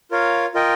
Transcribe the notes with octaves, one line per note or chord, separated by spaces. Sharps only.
F4 A#4 C#5 F5
F4 A#4 D#5 G5